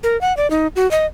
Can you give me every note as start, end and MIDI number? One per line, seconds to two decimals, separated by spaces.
0.03 0.19 70
0.21 0.35 78
0.37 0.49 74
0.51 0.67 63
0.76 0.89 66
0.91 1.06 75